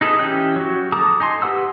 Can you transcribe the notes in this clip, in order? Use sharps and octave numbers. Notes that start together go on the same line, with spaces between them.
D#4 G#4 A4 B4 D#5
E3 C#4 G4 G5 F#6
F#3 F#4
A4 A5 A#5 D6 D#6
D#4 G#5 C6
G4 B4 F#5 E6